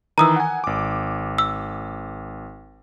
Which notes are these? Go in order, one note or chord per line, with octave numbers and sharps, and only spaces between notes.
D#3 E3 A#5 D#6 E6
F#5 G#5
G#1 D6
E6